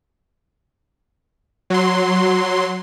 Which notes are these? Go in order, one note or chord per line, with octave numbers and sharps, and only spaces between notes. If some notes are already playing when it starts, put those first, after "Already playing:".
F#3 C6